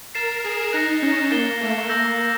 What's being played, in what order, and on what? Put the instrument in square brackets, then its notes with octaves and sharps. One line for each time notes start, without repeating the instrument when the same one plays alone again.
[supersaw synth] A#4 [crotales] A6 C7 E7
[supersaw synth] G#4
[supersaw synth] D#4 [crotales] F#6 A#6 C#7
[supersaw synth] C#4
[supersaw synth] A#3 [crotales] F#6 A6 C7 E7 G7
[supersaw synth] A3
[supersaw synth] A#3 [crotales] E6 G6 A#6